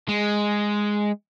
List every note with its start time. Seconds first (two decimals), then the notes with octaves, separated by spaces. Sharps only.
0.08 G#3